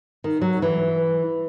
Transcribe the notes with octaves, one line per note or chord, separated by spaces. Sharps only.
D#3
F#3
E3